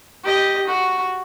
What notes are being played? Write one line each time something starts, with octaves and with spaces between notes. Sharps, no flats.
G4 D#5
F#4